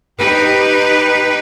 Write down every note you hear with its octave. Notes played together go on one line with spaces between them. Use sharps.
D#4 G4 B4